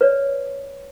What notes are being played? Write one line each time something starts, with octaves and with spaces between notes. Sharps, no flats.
B4 C#5 D5